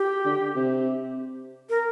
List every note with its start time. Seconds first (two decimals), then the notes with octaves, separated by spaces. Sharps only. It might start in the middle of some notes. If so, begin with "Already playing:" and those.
Already playing: G4
0.25 D3
0.55 C3
1.70 A#4